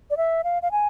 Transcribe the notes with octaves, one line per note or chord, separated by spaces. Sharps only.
D5
E5
F5
F5
G#5